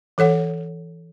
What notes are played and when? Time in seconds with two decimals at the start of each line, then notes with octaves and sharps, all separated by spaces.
0.18 E3 A4 C#5 F#5